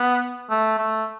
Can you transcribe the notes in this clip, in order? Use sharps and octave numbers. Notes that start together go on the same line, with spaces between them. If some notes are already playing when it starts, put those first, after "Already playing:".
Already playing: B3
A3
A3